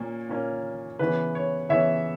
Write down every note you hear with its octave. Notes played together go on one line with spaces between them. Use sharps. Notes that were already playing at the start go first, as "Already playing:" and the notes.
Already playing: A#2 A#3 C#4
A#2 A#3 C#4
C#3 E3 B3 B4
C#5
C#3 E3 B3 C#5 E5